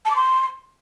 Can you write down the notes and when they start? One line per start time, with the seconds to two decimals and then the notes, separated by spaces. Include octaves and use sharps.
0.05 A5
0.10 D6
0.16 C6